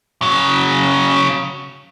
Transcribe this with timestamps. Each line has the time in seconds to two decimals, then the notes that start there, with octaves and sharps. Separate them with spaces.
0.22 C#3 F#3